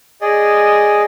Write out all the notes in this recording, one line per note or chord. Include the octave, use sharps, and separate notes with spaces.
G#4 D5 D#5